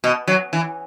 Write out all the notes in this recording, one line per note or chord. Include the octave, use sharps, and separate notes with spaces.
B2
F#3
E3